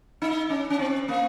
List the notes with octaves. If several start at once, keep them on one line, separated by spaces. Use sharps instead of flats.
D#4
C#4
C#4
C4
A#3